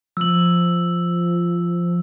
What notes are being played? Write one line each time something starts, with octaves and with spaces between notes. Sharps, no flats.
F3 E6 F#7